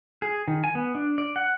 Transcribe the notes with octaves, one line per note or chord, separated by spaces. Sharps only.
G#4
D#3
G#5
B3
D4
D5
F#5